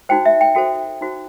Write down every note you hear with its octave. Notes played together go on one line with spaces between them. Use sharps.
D#4 F#4 C5 G5
E5
G5
F#4 A4 C5 G5
D#4 F#4 C5